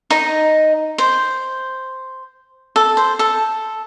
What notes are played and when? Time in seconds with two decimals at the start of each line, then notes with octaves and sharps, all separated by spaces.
0.10 D#4 D#5
0.98 C5
2.76 A4
2.97 C5
3.19 A4